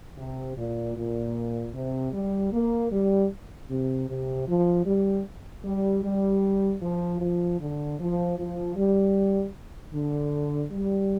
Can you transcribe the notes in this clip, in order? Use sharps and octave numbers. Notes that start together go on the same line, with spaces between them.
C3
A#2
A#2
C3
G3
A#3
G3
C3
C3
F3
G3
G3
G3
F3
F3
D3
F3
F3
G3
D3
G3